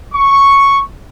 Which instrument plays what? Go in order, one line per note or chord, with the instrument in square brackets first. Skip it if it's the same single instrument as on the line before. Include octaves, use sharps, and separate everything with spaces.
[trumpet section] C#6